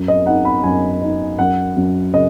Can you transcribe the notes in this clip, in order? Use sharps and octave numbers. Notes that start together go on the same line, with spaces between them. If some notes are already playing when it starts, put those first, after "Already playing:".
Already playing: F#2
D#5
D#4 F#5
B5
F#2 G#5
D#4
F#2 F#5
F#2
C#3 D#5